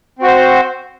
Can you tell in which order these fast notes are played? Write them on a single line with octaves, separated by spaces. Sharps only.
C4 F#4 C5